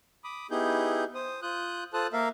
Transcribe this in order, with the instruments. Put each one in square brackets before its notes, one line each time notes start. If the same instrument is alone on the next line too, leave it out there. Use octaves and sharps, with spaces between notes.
[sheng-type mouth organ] B5 D6 D#6
B3 D#4 E4 G4 G#4 G6
C5 D#6
F4 D#6 F#6 G6
F4 A4 C5 A5 D#6 F#6
A#3 A#4 E5 F5